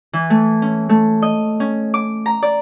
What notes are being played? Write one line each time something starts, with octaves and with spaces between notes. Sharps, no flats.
E3
A3
C#4
A3
D#5
C#4
D6
A#5
D5